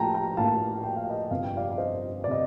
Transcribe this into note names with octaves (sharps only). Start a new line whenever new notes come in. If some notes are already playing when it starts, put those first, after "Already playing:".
Already playing: A#1 A2 F3 G5 A5 A#5
G5 A#5
A#1 A2 F3 F5 A5
G5
F5
D#5 G5
G1 F2 C3 F5
G5
D5 F5
F5
C5 D#5
D5
C3 D#5